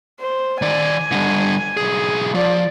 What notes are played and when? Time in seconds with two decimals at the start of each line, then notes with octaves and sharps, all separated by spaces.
0.20 C5
0.62 D#3 D5 G#5
1.12 D3 G3
1.77 B1 G#4
2.35 F3 D5